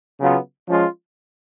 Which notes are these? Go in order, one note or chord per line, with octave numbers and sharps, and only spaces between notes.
C#3 F#3 B3 F4
F3 G#3 C#4 F4